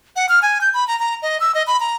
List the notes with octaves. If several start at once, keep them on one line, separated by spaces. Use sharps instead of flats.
F#5
F6
G#5
G6
B5
A#5
A#5
D#5
E6
D#5
B5
A#5